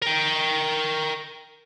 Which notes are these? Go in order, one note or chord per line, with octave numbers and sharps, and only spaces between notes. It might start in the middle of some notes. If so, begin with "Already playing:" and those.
A#4 G5